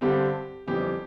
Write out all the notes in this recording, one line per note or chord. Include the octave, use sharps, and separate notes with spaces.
G2 D3 G3 C4 G4
G1 F2 E3 G3 C4 G4